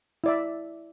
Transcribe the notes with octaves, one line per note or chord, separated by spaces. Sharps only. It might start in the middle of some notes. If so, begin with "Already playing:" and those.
E4 D5 E5